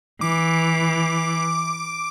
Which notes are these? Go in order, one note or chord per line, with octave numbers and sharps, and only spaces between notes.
E3 D6